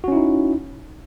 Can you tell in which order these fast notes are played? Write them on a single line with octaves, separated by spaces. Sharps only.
F#4 C#4 E4 D#4